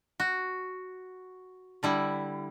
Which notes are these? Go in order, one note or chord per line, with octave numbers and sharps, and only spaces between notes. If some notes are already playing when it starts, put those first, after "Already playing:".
F#4
D3 G3 E4